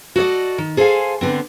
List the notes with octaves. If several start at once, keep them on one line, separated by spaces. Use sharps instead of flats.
F#4 A4 D5 D#5
D#3
G#4 A4 C5 D#5 F5 G#5
D3 B3 C4